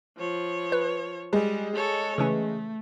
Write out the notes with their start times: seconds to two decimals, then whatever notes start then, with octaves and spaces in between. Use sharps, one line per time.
0.17 F3 C#5
0.72 B4
1.33 G3 G#3
1.75 A4 C#5
2.18 C#3 E3 A3 C#4